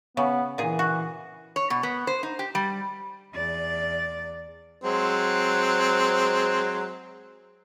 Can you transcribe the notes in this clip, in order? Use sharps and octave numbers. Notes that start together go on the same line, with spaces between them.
C#3 B3
A#2 E3 G#4
F#4
C#5
B2
B3
C5
D#4
G4
G3
E2 D5
F#3 G#3 C4